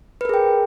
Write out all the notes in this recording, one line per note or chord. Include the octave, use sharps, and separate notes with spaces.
G#4 A#4 B4 G5